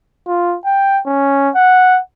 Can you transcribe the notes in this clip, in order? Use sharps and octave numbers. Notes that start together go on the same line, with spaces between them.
F4
G5
C#4
F#5